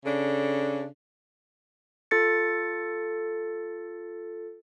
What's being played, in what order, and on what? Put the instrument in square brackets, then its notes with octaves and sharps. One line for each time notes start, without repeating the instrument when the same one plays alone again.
[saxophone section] C#3 D4 A4
[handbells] F4 A4 A6 C#7